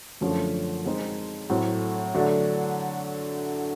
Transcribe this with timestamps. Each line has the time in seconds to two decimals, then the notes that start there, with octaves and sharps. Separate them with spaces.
0.21 F#2 D3 F3 A3 C#4
0.86 G#3 C4 D#4
1.50 A2 F#3 A3 C4
2.14 D3 F#3 A3 D4